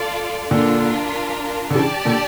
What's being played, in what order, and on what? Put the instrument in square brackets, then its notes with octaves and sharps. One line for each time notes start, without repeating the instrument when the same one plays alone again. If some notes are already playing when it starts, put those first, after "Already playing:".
Already playing: [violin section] F4 A4 D5
[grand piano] A#2 D3 [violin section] D4 F4 A#4
[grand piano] D3
[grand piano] C#3 E3 [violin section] G4 D5 A5
[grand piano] A#2 D3